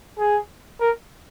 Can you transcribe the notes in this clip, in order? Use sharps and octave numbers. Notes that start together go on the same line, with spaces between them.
G#4
A#4